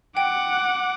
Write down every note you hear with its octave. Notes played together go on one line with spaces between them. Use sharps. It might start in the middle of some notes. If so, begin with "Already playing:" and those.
F#5 G5 D6